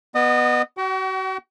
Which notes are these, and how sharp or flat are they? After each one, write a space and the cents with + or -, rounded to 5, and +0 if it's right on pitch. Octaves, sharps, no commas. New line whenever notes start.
B3 +0 D#5 -35 D#6 +0
F#4 +35 G5 -45